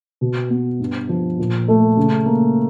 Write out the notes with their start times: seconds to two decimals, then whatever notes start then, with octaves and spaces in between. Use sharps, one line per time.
0.21 B2
0.50 B3
0.80 G2
1.09 F3
1.39 A#2
1.68 A3
1.97 C#3
2.26 A#3